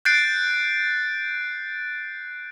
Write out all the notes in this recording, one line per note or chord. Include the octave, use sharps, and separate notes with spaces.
F#6 G6 A6 C7 D7